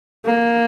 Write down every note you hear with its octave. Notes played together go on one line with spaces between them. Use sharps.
A#3